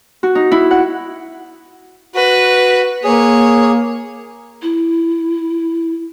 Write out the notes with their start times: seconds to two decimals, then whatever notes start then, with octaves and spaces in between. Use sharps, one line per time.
0.23 F#4
0.35 D#4
0.52 E4
0.71 F#5
2.15 F#4 B4
3.04 A#3 G#4 C#5
4.62 E4